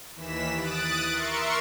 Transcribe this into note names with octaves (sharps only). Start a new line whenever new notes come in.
D#2 E3 B6 E7
D#6 F#6 A6 D7
A#4 E5 C6 C#6 C#7